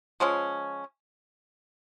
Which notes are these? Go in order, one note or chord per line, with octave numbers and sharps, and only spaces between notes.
F3 G#3 C#4